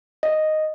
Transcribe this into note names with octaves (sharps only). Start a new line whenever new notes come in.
D#5